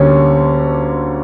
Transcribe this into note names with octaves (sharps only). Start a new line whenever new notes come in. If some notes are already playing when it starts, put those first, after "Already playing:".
Already playing: D2 D3 G3 A#3 C#4